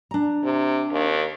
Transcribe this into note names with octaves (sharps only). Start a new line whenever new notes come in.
D4 A#5
C3
D#2